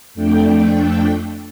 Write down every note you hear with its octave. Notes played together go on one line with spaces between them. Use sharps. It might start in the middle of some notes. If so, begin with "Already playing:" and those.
F2 A3 D4 G5